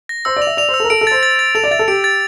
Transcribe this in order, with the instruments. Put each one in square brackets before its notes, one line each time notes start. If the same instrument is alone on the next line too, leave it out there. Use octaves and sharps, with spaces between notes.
[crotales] A#6
[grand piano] C5 [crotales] E6
[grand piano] D5
[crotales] F7
[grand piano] E5
[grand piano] D5 [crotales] F7
[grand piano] C5
[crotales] E6
[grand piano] A4
A#4
[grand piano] A4 [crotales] D7
[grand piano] A4
[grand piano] C5 [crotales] A6
[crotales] A6
A6
[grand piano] A4 [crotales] F7
[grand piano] D5
[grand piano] E5 [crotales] A6
[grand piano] A4
[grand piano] G4 [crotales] D7
[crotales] A6